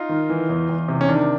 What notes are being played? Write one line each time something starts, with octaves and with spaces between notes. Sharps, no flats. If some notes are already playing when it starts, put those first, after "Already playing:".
Already playing: D#4 F4
D#3
E3
E2
E2
C3
C#4
D#3 D4